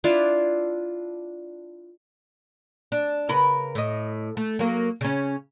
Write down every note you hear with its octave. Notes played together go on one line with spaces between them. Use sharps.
D4 E4 F4
D4
C#3 A#4 B4
A2 D#5
A3
F#3 A#3
C#3 C#4